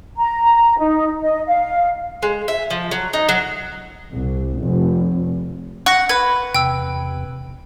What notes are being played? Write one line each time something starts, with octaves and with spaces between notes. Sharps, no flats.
A#5
D#4
D#5
F5
G#3
E5
F3
F#3
D#4
F#3
C2
F1
F#5 C#6 A#6
B4 G#6
E2 C3 G5 E6